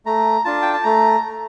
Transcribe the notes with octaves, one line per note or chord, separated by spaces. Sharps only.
A3 A#5
D4 F4 A5
G5
A5
A3 A#5